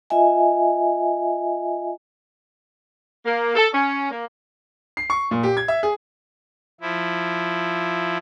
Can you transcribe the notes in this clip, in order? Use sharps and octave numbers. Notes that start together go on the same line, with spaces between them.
F4 D#5 E5 G#5
A#3
A4
C#4
A#3
C7
C#6
A#2
G4
G#6
E5
G#4
F3 E4